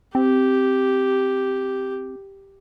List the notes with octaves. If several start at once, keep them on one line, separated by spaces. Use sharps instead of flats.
C4 G4